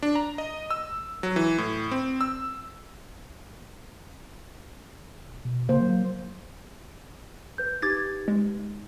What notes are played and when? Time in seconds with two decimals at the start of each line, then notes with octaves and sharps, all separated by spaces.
0.02 D4
0.15 A#5
0.38 D#5
0.71 E6
1.23 F#3
1.36 E3
1.58 A2
1.91 C4
2.21 E6
5.25 E1
5.45 B2
5.69 C#3 A#3 C5
5.81 F#3
7.58 B4 G6
7.82 D#4 G4 B4 D6 G#6 A6
8.28 G#3